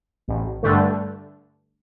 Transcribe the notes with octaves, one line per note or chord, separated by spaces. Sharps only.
A1
G2 D3 A3